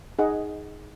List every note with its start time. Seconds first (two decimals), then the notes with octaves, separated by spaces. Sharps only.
0.19 D#4 G#4 D#5 F#5